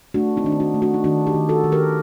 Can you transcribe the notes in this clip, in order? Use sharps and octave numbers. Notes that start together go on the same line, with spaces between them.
A3 D4 F#4
C4 D#4
D#3 D4
D#4
D4 F#4
A3
D4 F#4
D#4
D#3 D4 F#4
D#4 G4
D#3
F#4 A4
D#3
G4 A#4